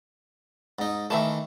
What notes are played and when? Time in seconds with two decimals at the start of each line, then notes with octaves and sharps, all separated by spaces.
0.79 G#2 D#4
1.10 D#3 E3 A3 E5 F5 A5